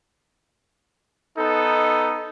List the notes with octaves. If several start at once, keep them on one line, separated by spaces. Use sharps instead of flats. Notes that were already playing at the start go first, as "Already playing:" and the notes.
B3 D#4 A4